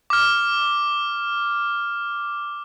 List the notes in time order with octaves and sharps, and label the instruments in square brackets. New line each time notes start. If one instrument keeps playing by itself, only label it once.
[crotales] D6 F6